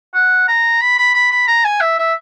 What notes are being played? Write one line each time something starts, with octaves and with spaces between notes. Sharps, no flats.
F#5
A#5
B5
B5
B5
B5
A#5
G#5
E5
E5